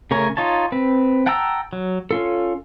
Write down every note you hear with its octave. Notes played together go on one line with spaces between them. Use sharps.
C#3 A3 A#4 C#5 G#5
D#4 F4 C#5 A5
C4 B4
F#5 G5 A5 A#5 E6
F#3
C#4 F4 A4